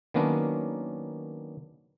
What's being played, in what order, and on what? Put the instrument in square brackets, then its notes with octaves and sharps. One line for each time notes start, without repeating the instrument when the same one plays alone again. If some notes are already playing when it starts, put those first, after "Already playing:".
[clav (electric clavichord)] D#3 F#3 A#3 B3 C#4 D4